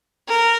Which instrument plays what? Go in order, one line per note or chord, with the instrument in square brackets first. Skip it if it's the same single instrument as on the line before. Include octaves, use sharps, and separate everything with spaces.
[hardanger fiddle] A#4